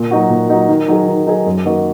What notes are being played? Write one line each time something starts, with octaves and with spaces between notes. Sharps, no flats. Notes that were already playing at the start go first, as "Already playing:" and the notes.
Already playing: A#2
F#3 D#4 F#4
A#2
F#3 D#4 F#4
D#3
F#3 D#4 G#4
D#3
F#3 D#4 G#4
F#2
D#3 A#3 D#4 F#4